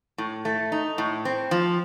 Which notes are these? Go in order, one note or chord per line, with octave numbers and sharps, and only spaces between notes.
A2
A3
D#4
A2
C4
F3